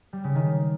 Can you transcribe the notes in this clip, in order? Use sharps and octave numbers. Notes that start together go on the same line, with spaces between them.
G3
C#3
D#3